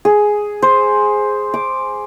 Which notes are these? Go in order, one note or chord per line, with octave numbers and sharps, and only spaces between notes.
G#4
C5
D6